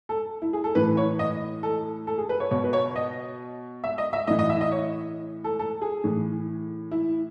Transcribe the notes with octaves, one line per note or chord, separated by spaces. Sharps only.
A4
E4
G#4
A4
A2 E3 B4
C#5
D#5
A4
A4
G#4
B4
C#5
B2 C#5
B4
C#5
D#5
E5
D#5
E5
A2 E3 D#5
D#5
E5
D#5
C#5
A4
A4
G#4
A2 E3
E4